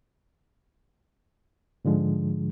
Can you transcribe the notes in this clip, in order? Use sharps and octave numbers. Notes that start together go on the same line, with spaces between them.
G#2 D3 F3 G#3